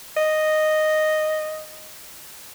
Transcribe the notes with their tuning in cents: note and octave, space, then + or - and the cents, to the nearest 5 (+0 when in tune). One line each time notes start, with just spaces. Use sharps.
D#5 -5